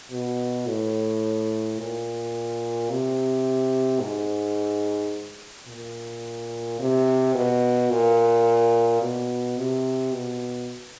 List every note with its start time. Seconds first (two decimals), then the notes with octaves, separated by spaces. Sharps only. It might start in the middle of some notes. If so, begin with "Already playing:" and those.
0.11 B2
0.67 A2
1.79 A#2
2.90 C3
4.00 G#2
5.68 A#2
6.80 C3
7.35 B2
7.91 A#2
9.02 B2
9.58 C3
10.13 B2